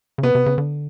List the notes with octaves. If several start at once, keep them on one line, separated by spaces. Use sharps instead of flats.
C#3
C3 B3
C3
C#3
D3